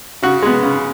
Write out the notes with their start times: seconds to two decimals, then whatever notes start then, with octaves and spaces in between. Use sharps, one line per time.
0.22 C#3 F#4
0.42 G#3 B3
0.63 C#3